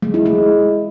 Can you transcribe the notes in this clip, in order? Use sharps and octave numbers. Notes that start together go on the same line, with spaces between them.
G#3
E4
G#3